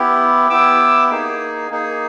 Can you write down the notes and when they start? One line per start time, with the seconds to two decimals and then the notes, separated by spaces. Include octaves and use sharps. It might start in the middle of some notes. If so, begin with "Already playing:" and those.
Already playing: B3 E4 G4
0.50 B3 E4 G4 D6 E6
1.10 A#3 D#4 G#4
1.71 A#3 D#4 G#4